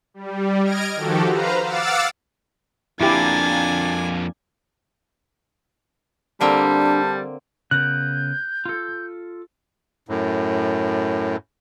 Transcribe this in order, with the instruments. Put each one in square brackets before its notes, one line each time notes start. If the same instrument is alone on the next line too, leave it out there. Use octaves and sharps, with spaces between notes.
[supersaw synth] G3
D#5 F6 G#6 A#6 D7
D#3 F3 F#4 G4 A4
B4 C5 F5 A#5
F5 F#5 D6 E6 A6
[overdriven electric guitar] F2 A#3 [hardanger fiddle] D4 G#5 [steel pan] E4 G4 [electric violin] A6
[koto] D3 A#3 C4 [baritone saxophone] G3 [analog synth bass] D4 [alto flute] A5
[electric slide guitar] C#3 B3 A#4 [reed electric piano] F#6 [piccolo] G6
[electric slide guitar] F4 A4
[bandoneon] F#2 A2